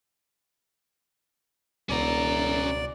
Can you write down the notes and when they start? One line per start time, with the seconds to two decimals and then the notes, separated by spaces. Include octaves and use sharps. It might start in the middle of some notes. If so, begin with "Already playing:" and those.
1.89 E1 C#2 B2 C#4 D5 A#5